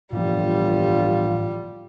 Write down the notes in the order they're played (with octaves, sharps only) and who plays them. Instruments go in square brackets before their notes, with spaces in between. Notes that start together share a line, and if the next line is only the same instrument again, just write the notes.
[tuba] G1 [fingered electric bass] A2 E3 F3 [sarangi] G3 [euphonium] F4